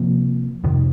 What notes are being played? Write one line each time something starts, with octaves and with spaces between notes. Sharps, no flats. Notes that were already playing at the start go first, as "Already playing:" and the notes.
Already playing: C3 F3 A#3
F2 C3 D#3